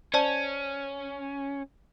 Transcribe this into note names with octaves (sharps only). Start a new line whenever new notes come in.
C#4 C5 D5 A5